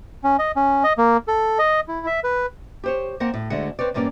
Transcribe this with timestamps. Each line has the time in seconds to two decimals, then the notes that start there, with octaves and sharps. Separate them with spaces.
0.24 C#4
0.39 D#5
0.56 C#4
0.84 D#5
0.98 A#3
1.28 A4
1.59 D#5
1.88 E4
2.06 E5
2.24 B4
2.84 G4 C5 C#5
3.20 A#3 C4 A#4 F#5
3.34 A2
3.50 D2 D3 G#3 E5 F#5
3.79 C4 B4 C#5 D5
3.94 E2 G2 A#3 C#4 D5